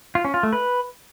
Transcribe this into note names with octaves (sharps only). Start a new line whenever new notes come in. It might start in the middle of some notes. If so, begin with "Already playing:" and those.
F4
C#4
F4
A3
B4